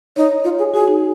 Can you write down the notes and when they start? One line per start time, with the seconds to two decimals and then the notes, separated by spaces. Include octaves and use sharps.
0.16 D#4 C#5
0.44 F4 C#5
0.59 G#4
0.73 F#4 G#4
0.88 D#4